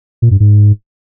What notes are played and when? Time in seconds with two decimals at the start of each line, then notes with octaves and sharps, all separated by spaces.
0.22 A#2
0.31 G2
0.40 G#2